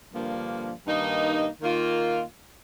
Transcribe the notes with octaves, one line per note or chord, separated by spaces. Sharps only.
G2 D3 F3 A#3
G2 D#3 A#3 D#4
D#3 A#3 F4